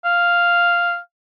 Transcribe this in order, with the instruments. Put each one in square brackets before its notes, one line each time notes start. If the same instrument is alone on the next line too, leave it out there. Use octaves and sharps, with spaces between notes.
[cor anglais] F5